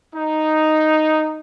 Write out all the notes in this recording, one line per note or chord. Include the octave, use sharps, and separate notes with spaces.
D#4